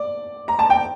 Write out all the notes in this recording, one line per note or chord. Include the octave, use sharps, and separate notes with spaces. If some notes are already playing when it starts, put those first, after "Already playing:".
Already playing: D5
A#5
A5
G5